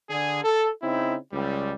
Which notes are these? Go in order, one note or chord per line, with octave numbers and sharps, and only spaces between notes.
D3 D4 G#4
A4
C#3 C4 D#4 E4
C#2 G3